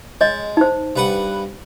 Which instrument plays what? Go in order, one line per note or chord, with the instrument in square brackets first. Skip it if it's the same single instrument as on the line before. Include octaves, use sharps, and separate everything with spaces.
[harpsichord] G#3 [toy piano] C#5 D#5
[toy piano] D#4 C5
[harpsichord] G2 B4 F#5